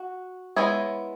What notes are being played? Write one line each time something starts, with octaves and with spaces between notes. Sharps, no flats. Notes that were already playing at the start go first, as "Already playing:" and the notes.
Already playing: F#4
G#3 B3 E4 G#4 C#5